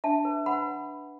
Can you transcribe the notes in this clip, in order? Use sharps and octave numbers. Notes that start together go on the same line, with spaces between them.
D4 E5 A5
B4
B4 F#5 B5